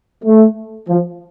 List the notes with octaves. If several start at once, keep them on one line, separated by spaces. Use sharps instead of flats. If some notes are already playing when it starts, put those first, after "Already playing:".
A3
F3